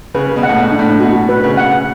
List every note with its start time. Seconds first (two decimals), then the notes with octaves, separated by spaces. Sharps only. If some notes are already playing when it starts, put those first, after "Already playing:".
0.14 C#3 B4
0.36 B2
0.43 F#5
0.49 A2
0.57 B2
0.72 D4
0.79 A2
1.00 B2 F#4
1.29 B4
1.44 C#3
1.57 F#5